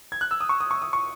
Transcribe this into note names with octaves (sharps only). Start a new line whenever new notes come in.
G#6
F#6
E6
D#6
C#6
D#6
C#6
D#6
C#6